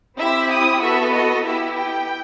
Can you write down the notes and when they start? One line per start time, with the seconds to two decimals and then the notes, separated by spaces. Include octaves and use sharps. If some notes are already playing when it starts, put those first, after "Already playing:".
0.18 C4 E4 G4 E5
0.50 D#6
0.81 B3 F#4 A4 E5
1.13 D#5
1.44 B3 E4 G4 E5
1.75 G5